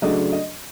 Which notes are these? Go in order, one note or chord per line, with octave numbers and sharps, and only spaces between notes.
C#3 F#3 A3 D4 D#5
D#5